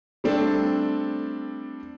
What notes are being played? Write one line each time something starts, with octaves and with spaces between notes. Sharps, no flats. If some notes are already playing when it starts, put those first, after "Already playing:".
G3 A3 C4 D4 A4